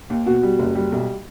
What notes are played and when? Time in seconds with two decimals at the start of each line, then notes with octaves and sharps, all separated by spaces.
0.10 D#2
0.26 B2 F#4
0.43 G3
0.59 F#1
0.75 G3
0.92 B1